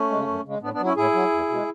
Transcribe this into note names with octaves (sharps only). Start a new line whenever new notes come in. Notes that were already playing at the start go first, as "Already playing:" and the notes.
Already playing: A3 C#4
C#3 G#3
F#2
C#3 G#3
A2 B3 D4
B3 D4
F#3
C#4 E4
A2 E4 G#4
F#3
E2
B2 G#3